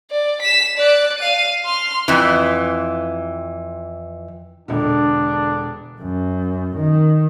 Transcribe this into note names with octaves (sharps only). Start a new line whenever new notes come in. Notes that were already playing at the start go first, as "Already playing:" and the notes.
D5
B6 E7
D5 F#6
F5 D#7
C6 F6
F2 E3
E1 D3 D4
F#2
D#3